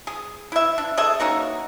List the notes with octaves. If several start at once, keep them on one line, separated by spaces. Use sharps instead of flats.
G#4
E4 E5
D4
G#4 A4 D#5 E5
A#3 C#4 D#4 F#4